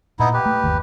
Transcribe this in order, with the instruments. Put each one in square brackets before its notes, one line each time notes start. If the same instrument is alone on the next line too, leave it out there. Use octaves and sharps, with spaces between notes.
[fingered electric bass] A#2 [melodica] B3 D#4 E4
[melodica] G4 B4
[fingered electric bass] A3
G1 D#2